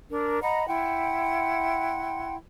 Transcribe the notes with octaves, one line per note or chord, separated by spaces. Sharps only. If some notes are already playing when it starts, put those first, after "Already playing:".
D4 A#4
D#5 F#5 A#5 B5
E4 F#5 G5 C6